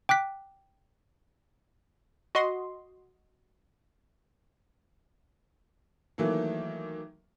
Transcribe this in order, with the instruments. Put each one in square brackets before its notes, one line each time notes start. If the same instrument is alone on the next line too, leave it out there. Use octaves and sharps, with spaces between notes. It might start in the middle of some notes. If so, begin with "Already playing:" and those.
[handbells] G5 D6 F#6 B6
[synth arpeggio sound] F#4 D#5 C6
[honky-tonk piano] D#3 E3 F#3 A3 A#3